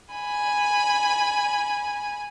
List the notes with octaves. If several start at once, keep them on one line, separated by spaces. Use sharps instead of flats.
G#5 B5